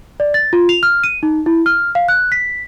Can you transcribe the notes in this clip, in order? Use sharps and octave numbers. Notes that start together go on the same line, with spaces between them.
D5
A6
F4
F7
F6
D#7
D#4
E4
F6
F5
F#6
B6